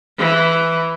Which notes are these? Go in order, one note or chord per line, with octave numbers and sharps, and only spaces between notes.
E3